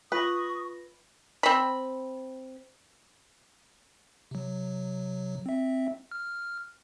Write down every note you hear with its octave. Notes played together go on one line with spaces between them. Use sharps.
F4 B4 C#6 D#6 A#6
C4 B5
C3 F#3
C4 E5
F6